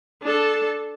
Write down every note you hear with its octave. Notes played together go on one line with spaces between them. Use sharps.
D4 A4